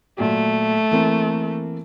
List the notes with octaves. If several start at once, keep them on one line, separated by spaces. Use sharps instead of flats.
A#2 F#3 A3
E3 A#3 C4